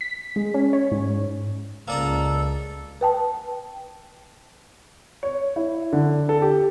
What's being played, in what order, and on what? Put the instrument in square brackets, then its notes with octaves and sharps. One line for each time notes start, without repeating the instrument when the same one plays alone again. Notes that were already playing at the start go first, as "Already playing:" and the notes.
[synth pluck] B6
G#3
C#4
C#5
G#2
[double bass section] C#2 [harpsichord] A#3 D5 A#5 [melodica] A4
[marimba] B4 G5 A5
[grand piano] C#5
E4
D3
A4
G4